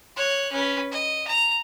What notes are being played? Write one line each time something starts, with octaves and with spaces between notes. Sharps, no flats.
C#5 F#6
C#4 B4
D#5
A#5